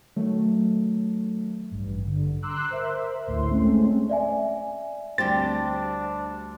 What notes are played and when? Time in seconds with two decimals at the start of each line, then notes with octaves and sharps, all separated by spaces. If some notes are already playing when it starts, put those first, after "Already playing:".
0.16 D#3 F#3 A3
1.71 A1 G2
2.06 D3
2.43 A#5 C6 D6 E6 F#6
2.68 A#4 C5 E5
3.27 G#1 D2 A2 C6
3.50 G#3 A3 C4 C#4
4.09 D5 E5 G#5
5.18 D2 G3 C4 D4 G4 C6 A6